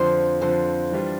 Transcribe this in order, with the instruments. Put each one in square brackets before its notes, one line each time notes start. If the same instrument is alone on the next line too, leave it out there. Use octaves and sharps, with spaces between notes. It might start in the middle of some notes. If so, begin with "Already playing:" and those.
Already playing: [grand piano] F2 D3 F3 [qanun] C5
[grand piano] F2 D3 F3 [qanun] C5
[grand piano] E3 G3 D4 F4